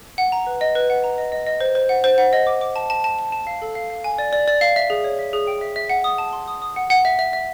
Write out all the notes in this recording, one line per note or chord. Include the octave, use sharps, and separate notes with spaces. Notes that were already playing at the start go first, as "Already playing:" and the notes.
F#5
A#5
B4
D#5
B4
F#5
A#5
D#5
D#5
D#5
C5
C5
F#5
C5
F#5
D#5
D6
D6
A5
A5
A5
A5
A5
F5
A4
F5
F5
G#5
D5
D5
D5
F5
E5
G#4
C#5
E5
G#4
G5
E5
E5
F#5
D#6
A5
C6
D#6
D#6
F#5
F#5
E5
E5
E5